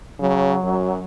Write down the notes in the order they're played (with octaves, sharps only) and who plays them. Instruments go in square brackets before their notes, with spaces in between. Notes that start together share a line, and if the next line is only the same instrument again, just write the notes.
[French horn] C#3 [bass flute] F#3
[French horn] F#2